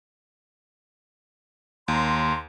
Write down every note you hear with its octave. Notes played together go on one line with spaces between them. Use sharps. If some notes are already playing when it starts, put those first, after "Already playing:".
D#2 A#5 C6